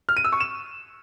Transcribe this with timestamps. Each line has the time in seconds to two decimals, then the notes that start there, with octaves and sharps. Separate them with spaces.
0.09 F6
0.17 D#7
0.25 E6
0.32 C#6
0.40 E7